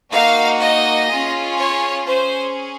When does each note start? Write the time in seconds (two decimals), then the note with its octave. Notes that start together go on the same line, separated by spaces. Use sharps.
0.12 A#3 D#4 F#4 F5
0.60 D#5
1.09 C#4 F4 G#4
1.58 C#5
2.06 C#4 G#4 C5